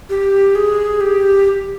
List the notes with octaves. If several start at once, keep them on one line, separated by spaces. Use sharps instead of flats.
G4
G#4
G4